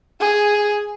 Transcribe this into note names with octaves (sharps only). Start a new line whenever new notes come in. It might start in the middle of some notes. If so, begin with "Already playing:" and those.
G#4